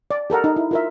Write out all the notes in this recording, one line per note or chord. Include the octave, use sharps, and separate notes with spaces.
D5
G4 A4 A#4 F#5
D#4
E4
F4 A#4 E5